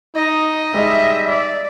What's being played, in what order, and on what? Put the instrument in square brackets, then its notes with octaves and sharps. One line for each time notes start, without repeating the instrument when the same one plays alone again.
[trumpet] D#4 [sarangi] D#5
[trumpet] G3 [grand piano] G#3 D#4 [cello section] E5
[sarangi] D5